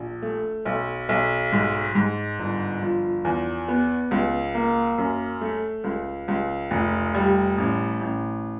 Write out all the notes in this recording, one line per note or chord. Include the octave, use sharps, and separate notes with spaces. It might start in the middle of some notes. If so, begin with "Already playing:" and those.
Already playing: A#1
A3
B1
B1
G#2
G#2
G1
F3
E2
B3
C#2
A#3
F#2
A3
C#2
C#2
F1
G3
A1
A1